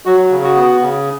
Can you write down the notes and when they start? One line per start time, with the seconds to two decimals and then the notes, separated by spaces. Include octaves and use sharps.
0.06 F#3 F#4
0.31 C#3
0.43 F#4
0.55 B3
0.81 C#3